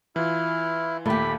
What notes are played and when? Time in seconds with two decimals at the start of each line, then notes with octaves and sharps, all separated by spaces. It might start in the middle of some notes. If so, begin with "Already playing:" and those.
0.16 E3 E4 F4 F6
1.06 D#2 A#2 A3 G4 B5